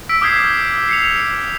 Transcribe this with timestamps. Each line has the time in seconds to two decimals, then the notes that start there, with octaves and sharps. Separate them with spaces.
0.09 E6 B6 D7
0.21 D6 D#6 F6 G6 G#6 C7
0.89 C7 C#7 F7